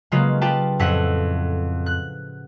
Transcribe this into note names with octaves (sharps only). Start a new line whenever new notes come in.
C#3 F#3 G#3 A#3 F4 B4
F4 G4 B4 G5 A5
F2 A2 E5 F#5 B6
F#6